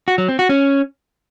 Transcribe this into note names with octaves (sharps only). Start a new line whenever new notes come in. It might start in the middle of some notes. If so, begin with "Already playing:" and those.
F#4
F#3
C4
F#4
C#4